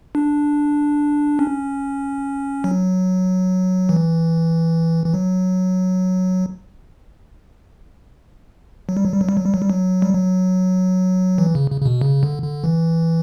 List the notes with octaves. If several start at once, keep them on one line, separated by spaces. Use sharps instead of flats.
D4
C#4
F#3
E3
E3
F#3
F#3
G3
F#3
G3
F#3
G3
F#3
G3
F#3
G3
F#3
G3
F#3
E3
C#3
C#3
C#3
B2
C#3
D3
D3
E3